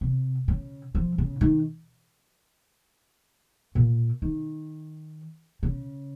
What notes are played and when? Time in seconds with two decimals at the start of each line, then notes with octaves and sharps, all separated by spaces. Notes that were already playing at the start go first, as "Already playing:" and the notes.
0.01 C3
0.48 C#3
0.95 F3
1.18 C#3
1.41 D#3
3.75 A#2
4.22 D#3
5.63 C#3